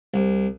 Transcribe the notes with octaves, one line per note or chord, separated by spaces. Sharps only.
C2